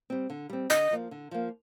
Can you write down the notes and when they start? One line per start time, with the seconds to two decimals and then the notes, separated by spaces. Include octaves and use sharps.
0.10 G3 C4
0.30 D3
0.50 G3 C4
0.70 D3 D#5
0.91 F3 A#3
1.11 D3
1.31 F3 A#3